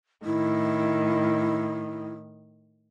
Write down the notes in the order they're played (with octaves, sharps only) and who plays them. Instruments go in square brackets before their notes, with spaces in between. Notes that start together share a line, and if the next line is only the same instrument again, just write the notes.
[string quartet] A2 D#3 [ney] E4